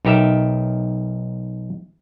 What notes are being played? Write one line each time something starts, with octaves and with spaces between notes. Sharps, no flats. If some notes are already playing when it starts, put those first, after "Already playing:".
B1 D#4 G4 A#4 E5